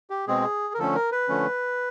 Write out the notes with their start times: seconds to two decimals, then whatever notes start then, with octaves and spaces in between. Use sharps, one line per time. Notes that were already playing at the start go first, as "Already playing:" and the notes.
0.10 G4
0.28 B2 G#3 C4 G#4
0.74 A#4
0.78 D3 F3 A3 C#4 A4
0.95 A#4
1.12 B4
1.29 D3 F3 A3 C#4